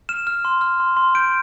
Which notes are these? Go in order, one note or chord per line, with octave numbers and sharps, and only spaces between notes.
F6 E7
F6
C6
F6
C6
C6
G6 D7